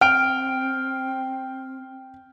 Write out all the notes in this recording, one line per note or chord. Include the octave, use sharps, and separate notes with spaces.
C4 G5 F6 D7